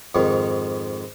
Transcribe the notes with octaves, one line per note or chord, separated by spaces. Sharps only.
F2 G#2 D#3